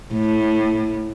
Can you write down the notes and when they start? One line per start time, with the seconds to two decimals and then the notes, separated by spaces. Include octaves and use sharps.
0.13 A2